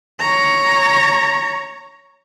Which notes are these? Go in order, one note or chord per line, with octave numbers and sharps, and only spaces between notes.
C#5 A#5